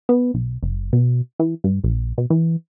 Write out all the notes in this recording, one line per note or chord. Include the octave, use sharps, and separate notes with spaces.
B3
B1
F#1
B2
E3
G2
A#1
B2
E3